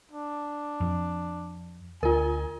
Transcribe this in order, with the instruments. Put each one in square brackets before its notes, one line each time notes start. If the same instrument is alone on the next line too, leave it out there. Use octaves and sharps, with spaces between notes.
[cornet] D4
[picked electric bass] F2
[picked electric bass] D2 [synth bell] F4 A#4 [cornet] G#5